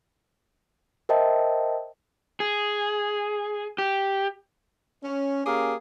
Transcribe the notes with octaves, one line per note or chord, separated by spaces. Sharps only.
A#4 C5 D#5 E5 G5 A5
G#4
G4
C#4
A#3 C#4 G4 G#4 A#4 F5